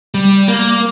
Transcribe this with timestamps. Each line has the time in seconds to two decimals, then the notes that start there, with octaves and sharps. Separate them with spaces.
0.14 G3
0.48 A#3